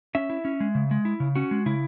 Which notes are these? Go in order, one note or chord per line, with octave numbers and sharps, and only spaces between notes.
C#4 E5
E4
C#4
G#3
C#3
G#3
E4
C#3
C#4 F#4
G#3
C#3 E4